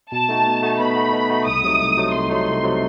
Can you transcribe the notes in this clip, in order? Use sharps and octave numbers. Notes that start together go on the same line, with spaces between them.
B2 A5
A3 D#4 F#4
B2
A3 D#4 F#4
B2 B5
A3 D#4 F#4
B2
A3 D#4 F#4
C2 D#6
C3 F#3 A3 D#4
C2
C3 F#3 A3 D#4
C2 C6
C3 F#3 A3 D#4
C2
C3 F#3 A3 D#4